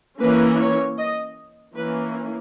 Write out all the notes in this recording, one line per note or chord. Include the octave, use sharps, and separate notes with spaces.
E3 A#3 C#4 B4
C#5
D#5
E3 A#3 C#4 B4